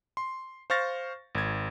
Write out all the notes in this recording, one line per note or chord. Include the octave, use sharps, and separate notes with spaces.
C6
C5 F5 C#6 F6 A6 A#6
G#1 G#6